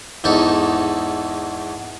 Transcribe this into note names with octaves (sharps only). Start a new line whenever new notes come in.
E2 G#2 D#4 A4 D#5